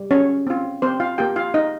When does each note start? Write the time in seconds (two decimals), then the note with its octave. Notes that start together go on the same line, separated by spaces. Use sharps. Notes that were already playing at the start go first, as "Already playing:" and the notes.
Already playing: G3
0.11 C#4 C#5
0.47 C4 F4
0.82 C4 C5
1.00 F4 F5
1.18 A#3 F4 G4 G5
1.36 F4 F5
1.54 D#4 D#5